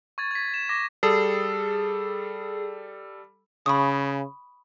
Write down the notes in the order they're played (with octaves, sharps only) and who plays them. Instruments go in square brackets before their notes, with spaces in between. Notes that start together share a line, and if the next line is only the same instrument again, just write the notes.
[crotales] C#6 G#6 A6
G#6 B6
E7
D6 A#6 B6
[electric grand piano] G3 A4 [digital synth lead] G#4
[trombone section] C#3 [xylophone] B5 C#6 D#6